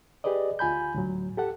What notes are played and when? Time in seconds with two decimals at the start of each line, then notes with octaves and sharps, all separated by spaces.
0.24 G4 G#4 B4 D5 D#5
0.59 D2 F4 G#5 B5 G6
0.95 D2 A2 F#3
1.37 G4 A4 F#5